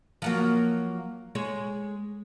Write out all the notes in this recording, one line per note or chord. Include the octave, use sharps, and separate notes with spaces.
F3 F#3 A#3
G#3 G#4 C#5